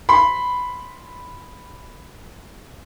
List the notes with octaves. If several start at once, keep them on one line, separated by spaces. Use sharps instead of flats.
B5 C6